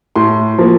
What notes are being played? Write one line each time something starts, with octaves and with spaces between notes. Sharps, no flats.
A2 C6
F3 A#3